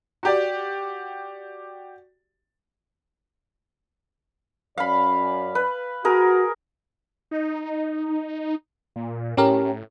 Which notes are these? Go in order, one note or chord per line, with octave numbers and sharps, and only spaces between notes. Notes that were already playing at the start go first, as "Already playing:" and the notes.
F#4 G4 D5
F#2 C#4 D5 F5 B5
B4
F#4 G#4 A#4
D#4
A#2
A2 C#4 G4 A#4